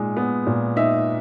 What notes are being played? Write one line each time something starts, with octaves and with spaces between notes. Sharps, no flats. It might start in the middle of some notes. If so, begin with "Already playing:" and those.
Already playing: A#2 G#3 D#4
B3
A#2
D#4 E5